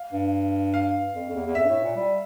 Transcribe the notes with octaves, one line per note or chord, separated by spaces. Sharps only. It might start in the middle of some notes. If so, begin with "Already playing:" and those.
Already playing: F5
G2
F5
F2
F2
E2
E2
F2 E5
G2
A2
A#2
G3